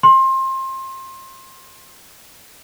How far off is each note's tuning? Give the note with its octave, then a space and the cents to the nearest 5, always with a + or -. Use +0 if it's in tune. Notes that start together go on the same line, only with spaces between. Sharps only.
C6 +25